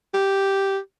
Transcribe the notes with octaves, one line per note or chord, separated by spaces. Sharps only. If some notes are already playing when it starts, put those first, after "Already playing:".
G4